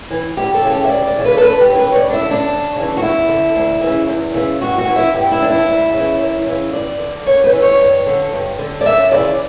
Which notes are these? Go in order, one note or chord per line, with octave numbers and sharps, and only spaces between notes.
E3
D2 G4
A4
C#3 E3
G4
E5
D2 D5
D5
C#3 E3
B4
A4
E2 B4
G4
C#3 E3
B4
C#5
G2 D5
D4
E4
D3
D4
D2
C#3 E3
F#4
E2 E4
D3
D2
C#3 E3
E2
C#3 E3
G2 F#4
F#4
E3
E4
G2 G4
E4
E3 D4
E4
D2
C#3 E3
F#2
C#3 E3
G2 D5
D3
F#2 C#5
B4
E3
C#5
G2
D3
G2
D3
D5
F#2 E5
C#3 E3 D5